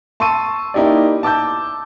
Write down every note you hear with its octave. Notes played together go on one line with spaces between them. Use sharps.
A5 C6 C#6 E6 D#7
A#3 D#4 E4 G4 D5
A5 D6 E6 G6